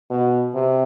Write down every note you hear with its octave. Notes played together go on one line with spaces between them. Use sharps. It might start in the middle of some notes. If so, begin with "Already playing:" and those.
B2
C3